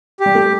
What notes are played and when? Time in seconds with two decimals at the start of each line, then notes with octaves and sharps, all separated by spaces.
0.20 G4
0.26 G3
0.35 A3